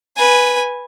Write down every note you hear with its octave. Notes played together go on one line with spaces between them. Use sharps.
B4 G#5